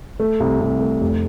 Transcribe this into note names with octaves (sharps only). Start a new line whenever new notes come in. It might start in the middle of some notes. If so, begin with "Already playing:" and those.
A3
C2
C2
A3
F1